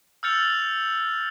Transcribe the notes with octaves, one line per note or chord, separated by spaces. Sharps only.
E6 F6 G6 A6 C#7 F7